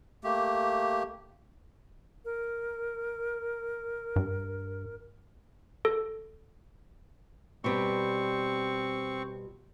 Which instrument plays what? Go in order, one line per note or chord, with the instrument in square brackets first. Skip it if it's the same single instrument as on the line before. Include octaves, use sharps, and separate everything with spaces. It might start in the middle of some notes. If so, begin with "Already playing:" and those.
[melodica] A3 A#3 G4
[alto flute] A#4
[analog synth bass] G2
[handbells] A4
[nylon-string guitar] B2 G3 [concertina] C4 C#6